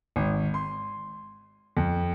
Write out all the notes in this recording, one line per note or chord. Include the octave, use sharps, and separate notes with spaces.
G#1
C6
F2